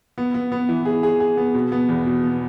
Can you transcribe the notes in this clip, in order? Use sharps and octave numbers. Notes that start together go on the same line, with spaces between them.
B3
B3
B3
E3
G#4
G#4
G#4
B3
B2
B3
E2
B2
B3